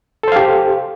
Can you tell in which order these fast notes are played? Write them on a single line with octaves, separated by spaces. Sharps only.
A4 C5 F5 G4